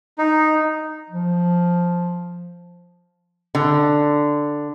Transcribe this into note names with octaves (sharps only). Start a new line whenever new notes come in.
D#4
F3
D3